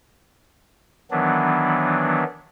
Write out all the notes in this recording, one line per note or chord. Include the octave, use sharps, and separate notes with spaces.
D#3 E3 F#3 B3 D4